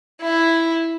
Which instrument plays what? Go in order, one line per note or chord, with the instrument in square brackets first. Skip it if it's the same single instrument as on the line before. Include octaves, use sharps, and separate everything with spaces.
[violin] E4